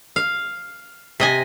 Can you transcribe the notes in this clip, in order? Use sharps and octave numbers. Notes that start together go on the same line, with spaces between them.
F5
C3 D#5 G#5